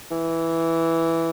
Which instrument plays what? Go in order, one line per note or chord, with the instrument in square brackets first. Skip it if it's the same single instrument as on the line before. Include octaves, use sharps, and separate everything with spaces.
[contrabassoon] E3